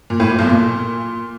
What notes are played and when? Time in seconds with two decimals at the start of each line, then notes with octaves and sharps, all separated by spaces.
0.10 A#2
0.20 A2
0.30 A#2
0.39 B1 B2
0.49 A#2